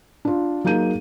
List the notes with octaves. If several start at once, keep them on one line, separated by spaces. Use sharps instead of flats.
D4 F4
F#3 A#3 D#4 G#4 G6 D#7